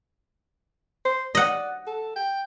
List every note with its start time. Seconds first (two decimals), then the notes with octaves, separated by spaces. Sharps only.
1.05 C5
1.35 D5 D#5 F#5
1.87 A4
2.16 G5